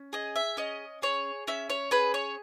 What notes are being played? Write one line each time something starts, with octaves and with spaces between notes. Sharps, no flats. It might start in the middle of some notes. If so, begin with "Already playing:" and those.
Already playing: C#4
G#4 D#5
E5
C#4 D#5
G#4 C#5
C#4 E5
C#5
G#4 B4
C#5